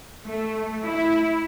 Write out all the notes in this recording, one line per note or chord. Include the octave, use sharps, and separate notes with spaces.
A3
E4